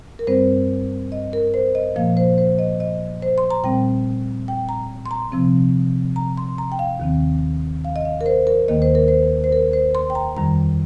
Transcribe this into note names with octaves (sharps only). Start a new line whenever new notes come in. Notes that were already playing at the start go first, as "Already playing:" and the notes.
A#4
G2 G3 C4 C5
D#5
A#4
C5
D#5
A#2 F3 A#3 F5
C5
C5
D#5
D#5
C5
C6
A#5
A#2 G3 C4 G5
G5
A#5
C6
A#5
C3 F3 C4
A#5
C6
A#5
G5
F5
D#2 D#3 C4
F5
D#5
F5
A#4
C5
A#4
D#2 D#3 A#3 D#5
C5
A#4
C5
C5
A#4
C5
C6
G5
A#5
F2 D#3 G3 A#5